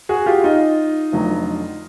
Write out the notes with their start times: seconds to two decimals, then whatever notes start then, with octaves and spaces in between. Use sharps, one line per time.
0.09 F#4 G#4
0.26 F4 G4
0.44 D#4 F4
1.12 F1 F2 D3 F#3